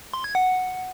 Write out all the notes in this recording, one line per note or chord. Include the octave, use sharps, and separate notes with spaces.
C6
G#6
F#5